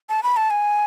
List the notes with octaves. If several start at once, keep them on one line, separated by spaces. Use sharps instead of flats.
A5
B5
A5
G#5